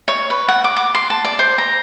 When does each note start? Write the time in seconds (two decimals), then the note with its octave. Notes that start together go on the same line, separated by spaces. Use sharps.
0.08 C#5
0.30 B4
0.48 F#5
0.64 D6
0.76 D6
0.95 C6
1.10 A5
1.24 D5
1.39 C5
1.58 A#5